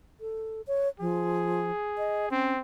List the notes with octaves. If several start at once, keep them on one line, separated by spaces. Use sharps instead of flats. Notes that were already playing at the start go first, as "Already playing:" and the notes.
A4
C#5
F3 G#4
D#5
C4 C#4